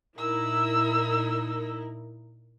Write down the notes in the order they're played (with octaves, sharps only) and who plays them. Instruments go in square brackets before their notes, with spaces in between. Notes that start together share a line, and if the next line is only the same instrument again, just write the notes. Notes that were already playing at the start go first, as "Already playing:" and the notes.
[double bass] A#2 [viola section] D#4 E4 A#4 [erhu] E6